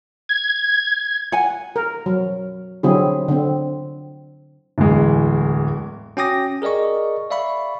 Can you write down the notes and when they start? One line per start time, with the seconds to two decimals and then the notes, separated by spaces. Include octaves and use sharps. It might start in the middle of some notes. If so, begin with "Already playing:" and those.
0.29 G#6
1.32 F#5 G#5
1.76 A#4
2.06 F#3
2.83 D3 F#3 C4 E4 G#4
3.28 D3 C4
4.78 D1 E2 G#3
6.17 C#4 F#4 G5 D6 D#6 A#6
6.62 G#4 A#4 D5 D#5 C#6
7.31 D5 E5 F5 B5 C#6